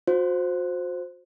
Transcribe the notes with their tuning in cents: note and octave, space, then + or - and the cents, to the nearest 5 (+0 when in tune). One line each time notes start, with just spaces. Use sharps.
F#4 -40 C5 +0